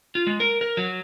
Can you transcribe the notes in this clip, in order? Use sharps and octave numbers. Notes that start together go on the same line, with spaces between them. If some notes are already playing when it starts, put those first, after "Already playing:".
F4
G#3
A#4
A#4
F#3